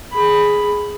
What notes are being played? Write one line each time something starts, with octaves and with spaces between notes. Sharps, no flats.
G#4 B5